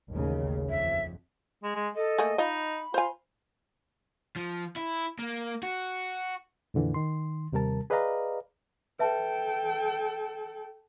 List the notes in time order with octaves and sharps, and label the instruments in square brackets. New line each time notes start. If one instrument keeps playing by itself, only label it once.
[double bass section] A1 D#2 C#3
[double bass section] F2 [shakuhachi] E5
[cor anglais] G#3
G#3
[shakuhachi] A4 [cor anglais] D#5
[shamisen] A3 A#3 G#4
[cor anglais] D#4 [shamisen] F4 D#5 [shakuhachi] B5
[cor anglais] F4 [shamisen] C5 G#5
[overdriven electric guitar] F3
E4
A#3
F#4
[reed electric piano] F2 A#2 D3 E3
D#3 C6
D#2 C3 G3 A#4 A5
G#4 B4 D5 D#5 F5 A#5
[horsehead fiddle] A4 G5 [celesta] B4 E5 A5